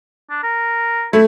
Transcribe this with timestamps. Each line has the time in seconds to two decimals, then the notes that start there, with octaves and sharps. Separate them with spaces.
0.30 D4
0.43 A#4
1.13 A3 E4